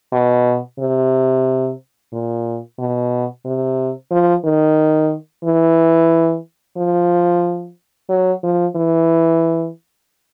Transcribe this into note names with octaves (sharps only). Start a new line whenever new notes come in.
B2
C3
A#2
B2
C3
F3
D#3
E3
F3
F#3
F3
E3